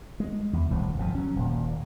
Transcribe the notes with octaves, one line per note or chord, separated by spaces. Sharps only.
G#3
E2
D#1 C2 A2
G1 B2 F3
F#3 C#4
D#1 A#2